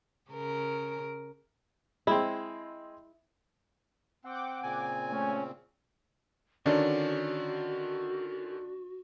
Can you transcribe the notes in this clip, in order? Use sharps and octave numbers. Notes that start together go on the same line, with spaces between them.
C#3 A#4
G#3 C4 E4
C4 F#5 G5 D6
A#2 C#3 C4 G#5
A3 C#4
D3 D#3 C#4 D4 F#4